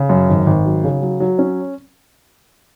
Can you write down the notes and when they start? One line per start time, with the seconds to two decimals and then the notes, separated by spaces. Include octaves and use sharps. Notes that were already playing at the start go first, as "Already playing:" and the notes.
Already playing: C#3
0.09 F#2
0.29 G#1
0.46 G#1
0.66 F#3
0.84 C#3
1.02 F#3
1.20 F#3
1.39 C#4